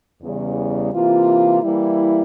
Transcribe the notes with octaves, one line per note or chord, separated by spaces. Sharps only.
E2 C#3 G3
C3 E3 A#3 F4
E3 G3 A#3 E4